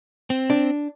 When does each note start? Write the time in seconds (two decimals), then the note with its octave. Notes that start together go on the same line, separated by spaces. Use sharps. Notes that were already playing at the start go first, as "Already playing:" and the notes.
0.30 C4
0.50 D4